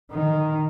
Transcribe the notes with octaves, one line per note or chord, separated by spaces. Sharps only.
D#3